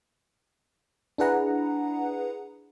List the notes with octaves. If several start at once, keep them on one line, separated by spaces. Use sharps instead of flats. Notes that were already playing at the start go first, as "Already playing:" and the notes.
D4 E4 G#4 B4 F#5 A#5